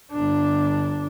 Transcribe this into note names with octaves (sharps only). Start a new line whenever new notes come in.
G1 D4